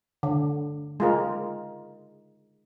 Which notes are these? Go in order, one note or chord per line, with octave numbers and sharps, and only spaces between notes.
D3
G#3 F4 A#4